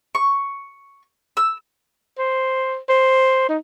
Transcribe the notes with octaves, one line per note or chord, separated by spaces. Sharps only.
C#6
E6
C5
C5
D#4